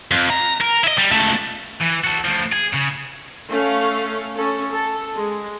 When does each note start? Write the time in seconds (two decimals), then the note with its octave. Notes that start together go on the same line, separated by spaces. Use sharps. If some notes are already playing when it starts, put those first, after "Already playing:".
0.11 F2
0.30 A#5
0.61 A#4
0.84 E4 D#5
0.98 G3
1.11 C#2 A3
1.81 E3
2.04 F#4 A4
2.25 A2 F3
2.52 G#4
2.73 C#3
3.50 A3 C#4 F5
4.36 C#4 A4
4.72 A4
5.14 G#3